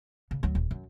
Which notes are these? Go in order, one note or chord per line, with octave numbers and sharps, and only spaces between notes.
C#3
D2 F#3
D#1
F#2